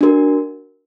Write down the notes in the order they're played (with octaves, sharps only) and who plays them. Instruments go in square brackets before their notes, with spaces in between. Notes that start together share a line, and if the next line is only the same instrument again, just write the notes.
[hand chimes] D4 F#4 A#4